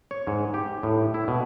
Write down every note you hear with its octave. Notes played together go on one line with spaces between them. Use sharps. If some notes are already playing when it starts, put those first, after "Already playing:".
C#5
G#2
G4
A2
E4
B2